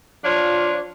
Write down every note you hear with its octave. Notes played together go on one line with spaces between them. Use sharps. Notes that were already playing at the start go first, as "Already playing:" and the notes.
F3 D4 F4 C#5